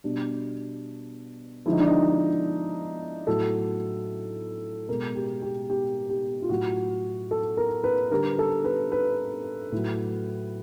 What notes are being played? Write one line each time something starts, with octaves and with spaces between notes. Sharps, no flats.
B2 G3 D4
D3 F3 G#3 E4
D#4
D4
D#4
A2 F#3 A4
B2 G#3 A#4
G4
G4
G4
G4
F4
A2 F#3 F#4
A4
A#4
B4
D3 G3 A#4
A4
B4
B4
A2 F#3